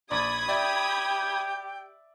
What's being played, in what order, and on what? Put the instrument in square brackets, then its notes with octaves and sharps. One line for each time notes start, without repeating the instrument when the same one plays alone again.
[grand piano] A#1 [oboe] D5 [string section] B5 D#6 G#6
[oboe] G4 [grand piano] D5 E5 [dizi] G5